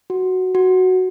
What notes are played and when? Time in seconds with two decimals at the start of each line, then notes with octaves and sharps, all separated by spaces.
0.10 F#4
0.55 F#4